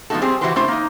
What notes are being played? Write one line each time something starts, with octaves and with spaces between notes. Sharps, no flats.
F3 A3 B3 D#4 F#4 A4
G3 C4 G4 G#4 C5
E3 F3 F#4 G4 B4 C5
A3 D4 E4 C5
A#3 D#4